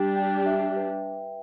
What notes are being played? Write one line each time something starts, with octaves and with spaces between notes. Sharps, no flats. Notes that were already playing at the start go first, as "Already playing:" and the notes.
Already playing: G3 D4 G4 G5
G5
E5
B4